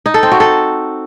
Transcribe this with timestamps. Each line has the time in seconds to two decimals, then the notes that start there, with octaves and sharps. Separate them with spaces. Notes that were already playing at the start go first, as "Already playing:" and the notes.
0.06 D#4
0.14 A4
0.23 C4
0.31 F#4
0.40 A4